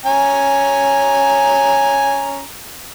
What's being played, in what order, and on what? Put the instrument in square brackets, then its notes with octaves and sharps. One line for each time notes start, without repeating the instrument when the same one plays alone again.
[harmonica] C#4 G#5 A#5